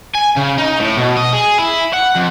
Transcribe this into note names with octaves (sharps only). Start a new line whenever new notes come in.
G#5
C#3
D#4
A2
B2
D#5
G#4
E4
F#5
F2